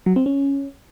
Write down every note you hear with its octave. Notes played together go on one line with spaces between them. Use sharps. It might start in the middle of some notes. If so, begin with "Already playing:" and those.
F#3
C4
C#4